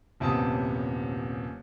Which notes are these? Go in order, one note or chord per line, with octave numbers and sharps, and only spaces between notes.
D#1 F#2 C3 B3 A5 D#6